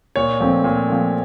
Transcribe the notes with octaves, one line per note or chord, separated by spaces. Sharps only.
A#2 C#5
F3 A3 C4
A#2
F3 A3 C4